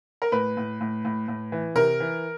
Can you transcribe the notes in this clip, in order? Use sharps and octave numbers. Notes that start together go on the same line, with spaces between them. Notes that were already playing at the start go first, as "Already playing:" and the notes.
A#4
A2 B4
A2
A2
A2
A2
E3
C3 A#4
E3